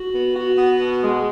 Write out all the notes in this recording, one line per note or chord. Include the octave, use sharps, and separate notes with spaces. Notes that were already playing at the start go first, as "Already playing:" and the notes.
Already playing: F#4
B3
F#4
B3
B2
G#3